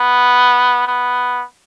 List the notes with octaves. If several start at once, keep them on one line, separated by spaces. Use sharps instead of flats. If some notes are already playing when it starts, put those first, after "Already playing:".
Already playing: B3
B3